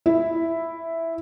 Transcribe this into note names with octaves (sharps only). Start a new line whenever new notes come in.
E4